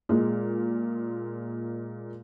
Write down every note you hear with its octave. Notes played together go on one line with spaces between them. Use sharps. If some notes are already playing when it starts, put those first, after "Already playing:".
A#2 G#3